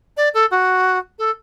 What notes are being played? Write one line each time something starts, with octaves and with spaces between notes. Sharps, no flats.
D5
A4
F#4
A4